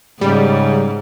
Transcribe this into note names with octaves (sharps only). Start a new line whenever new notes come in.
G#2 C#3 G3